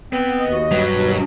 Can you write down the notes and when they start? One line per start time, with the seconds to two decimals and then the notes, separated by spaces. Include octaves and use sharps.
0.13 B3 C4
0.39 D#2 D#5
0.52 F#4
0.71 G2 F#3 B4
0.88 D#2 B2